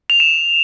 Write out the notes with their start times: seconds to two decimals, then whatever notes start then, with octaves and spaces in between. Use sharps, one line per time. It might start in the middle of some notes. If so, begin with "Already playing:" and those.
0.10 F7
0.20 E7